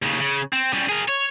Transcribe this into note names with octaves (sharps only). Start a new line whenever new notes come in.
D#2 C#3
C#3
C4
C#3 G3
G#4 A#4
C#5